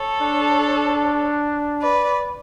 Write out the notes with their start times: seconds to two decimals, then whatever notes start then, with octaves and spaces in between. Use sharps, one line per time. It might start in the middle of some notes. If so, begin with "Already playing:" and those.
Already playing: A4 C#5
0.23 D4
1.81 B4 D5